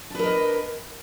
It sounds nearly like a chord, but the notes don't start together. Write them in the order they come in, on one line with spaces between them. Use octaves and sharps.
D4 B4 A#4 D#5